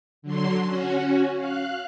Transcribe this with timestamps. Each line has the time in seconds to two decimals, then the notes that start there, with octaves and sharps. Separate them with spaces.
0.22 D3 F#3 C6
0.64 C#4 F#4
1.35 F5 F#6